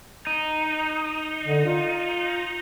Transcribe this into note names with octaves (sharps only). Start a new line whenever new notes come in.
D#4
D3
F4